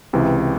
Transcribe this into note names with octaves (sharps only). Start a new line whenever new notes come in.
C#2 C3 E3